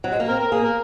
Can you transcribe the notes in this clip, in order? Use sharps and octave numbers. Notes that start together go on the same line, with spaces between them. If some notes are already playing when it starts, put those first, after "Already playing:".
F#3
G#3
A#3
C4 A#4
A#4
A#3 G#4
A#4